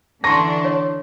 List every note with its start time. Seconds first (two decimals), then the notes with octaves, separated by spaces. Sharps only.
0.24 D3 E3 D4 A5 A#5 C6 C#6 A#6
0.65 C#5